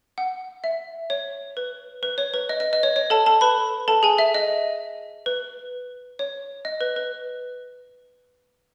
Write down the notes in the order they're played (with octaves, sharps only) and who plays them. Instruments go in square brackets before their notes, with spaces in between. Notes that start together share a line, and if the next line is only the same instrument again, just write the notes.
[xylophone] F#5
E5
C#5
B4
B4
C#5
B4
D#5
D#5
D#5
C#5
C#5
A4 A5
A4 A5
B4 B5
A4 A5
G#4 G#5
E5
D#5
B4
C#5
D#5
B4
B4